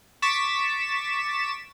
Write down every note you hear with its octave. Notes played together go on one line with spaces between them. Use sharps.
C#6 D6 A6 B6 E7